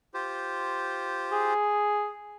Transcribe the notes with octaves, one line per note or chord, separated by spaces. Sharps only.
F4 G4 C5
G#4